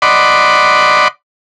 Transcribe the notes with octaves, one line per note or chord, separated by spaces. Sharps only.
D5 D#5 F#5 B5 C6 D6